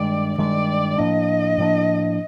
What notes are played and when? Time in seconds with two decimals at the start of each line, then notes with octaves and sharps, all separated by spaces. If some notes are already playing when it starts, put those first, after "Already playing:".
Already playing: G2 D#3 G#3 D5
0.38 G2 D#3 G#3 D5
0.98 A2 F3 A#3 D4 D#5
1.58 A2 F3 A#3 D4